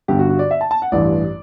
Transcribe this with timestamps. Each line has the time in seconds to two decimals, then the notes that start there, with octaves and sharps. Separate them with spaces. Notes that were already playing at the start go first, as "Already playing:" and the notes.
0.08 G1 G2 D3 G4
0.19 F#4
0.29 F#4
0.39 D5
0.51 E5
0.61 A5
0.71 A5
0.82 F#5
0.92 A1 G2 E3 D5